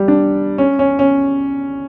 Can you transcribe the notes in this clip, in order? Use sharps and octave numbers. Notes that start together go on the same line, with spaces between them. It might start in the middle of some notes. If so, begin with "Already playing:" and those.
Already playing: G3
D4
C#4
C#4
C#4